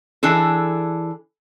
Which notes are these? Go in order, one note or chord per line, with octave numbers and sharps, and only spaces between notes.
E3 D4 G#4 A4